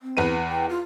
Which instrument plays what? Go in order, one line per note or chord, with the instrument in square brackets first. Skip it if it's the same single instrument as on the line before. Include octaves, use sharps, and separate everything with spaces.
[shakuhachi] C4
[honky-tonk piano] E2 B4 D#7
[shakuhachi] G5
F4